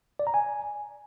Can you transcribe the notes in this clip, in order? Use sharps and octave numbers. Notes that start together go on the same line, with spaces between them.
D5
A#5
G#5